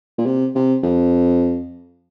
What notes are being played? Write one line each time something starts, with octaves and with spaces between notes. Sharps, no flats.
A#2
C3
C3
F2